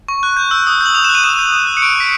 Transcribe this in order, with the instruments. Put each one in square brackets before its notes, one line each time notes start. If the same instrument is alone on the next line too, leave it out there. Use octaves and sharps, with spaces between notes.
[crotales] C#6
F#6
G6
E6
D#6
G6 F#7
D#6 F7
E7
F#6
D#7
D#6 E7
G6
D#6
F#6
C#7
C#6 D7
F#6 B6